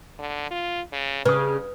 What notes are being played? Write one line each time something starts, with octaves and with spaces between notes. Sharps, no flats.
D3
F4
C#3
G2 C#3 B4 D#6